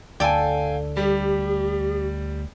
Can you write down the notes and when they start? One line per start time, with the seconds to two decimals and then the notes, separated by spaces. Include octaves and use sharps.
0.20 D2 A4 D5 F5 G5 G#5
0.97 G3 G4